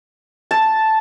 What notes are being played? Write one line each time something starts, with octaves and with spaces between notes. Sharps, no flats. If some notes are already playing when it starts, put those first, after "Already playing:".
A5